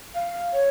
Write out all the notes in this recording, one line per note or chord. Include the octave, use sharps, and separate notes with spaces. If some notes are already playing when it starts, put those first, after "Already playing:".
F5
C#5